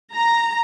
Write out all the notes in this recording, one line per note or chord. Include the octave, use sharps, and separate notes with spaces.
A#5